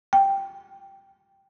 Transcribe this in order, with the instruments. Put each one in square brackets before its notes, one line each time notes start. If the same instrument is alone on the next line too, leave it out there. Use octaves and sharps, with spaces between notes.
[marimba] G5